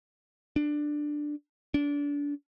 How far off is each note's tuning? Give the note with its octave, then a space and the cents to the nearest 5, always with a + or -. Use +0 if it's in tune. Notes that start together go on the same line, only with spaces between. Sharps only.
D4 +10
D4 -30